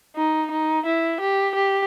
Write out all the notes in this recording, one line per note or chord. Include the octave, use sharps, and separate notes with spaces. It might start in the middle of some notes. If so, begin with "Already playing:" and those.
D#4
D#4
E4
G4
G4